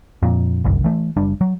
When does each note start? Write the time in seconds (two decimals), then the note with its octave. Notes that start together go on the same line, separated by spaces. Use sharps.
0.23 F2 A#2
0.64 G1 C2 F#2
0.84 E3 A3
1.17 F#1 G3 D4
1.41 F#3